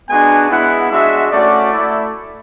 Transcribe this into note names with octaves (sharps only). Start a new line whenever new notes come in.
G#3 B3 D4 F#4 G#5
G#3 B3 E4 F#5
G#3 D4 F#4 E5
A3 C#4 F#4 D5
A3 E4